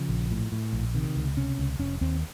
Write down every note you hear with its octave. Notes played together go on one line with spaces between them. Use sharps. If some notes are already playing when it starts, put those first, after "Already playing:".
Already playing: C#3 F3
A#1
A2
A2
A#1
C3 D#3
C#2
C3 C#4
C#2
F1 C#4
D#2 C4